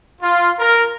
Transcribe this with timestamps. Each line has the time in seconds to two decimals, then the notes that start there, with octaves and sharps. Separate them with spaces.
0.21 F4
0.59 A#4